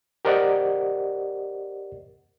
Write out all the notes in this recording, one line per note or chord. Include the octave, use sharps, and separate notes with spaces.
G4 A#4 C5 D5 D#5 F#5